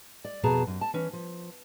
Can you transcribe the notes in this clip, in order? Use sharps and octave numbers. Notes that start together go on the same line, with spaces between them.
D5
F2 B2 G#4 A5 A#5
F#2
A5
E3 C#4
F3